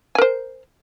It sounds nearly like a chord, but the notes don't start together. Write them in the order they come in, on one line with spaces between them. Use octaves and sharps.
G#5 A#4 C5